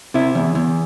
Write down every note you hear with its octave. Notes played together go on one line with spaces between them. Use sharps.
C3 E4
E2
E2